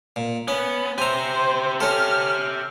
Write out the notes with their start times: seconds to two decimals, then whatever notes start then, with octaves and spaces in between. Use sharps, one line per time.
0.16 A#2
0.48 B3 C#4
0.98 G4 C5 E5 G#5 A#5
1.80 C#4 A4 F6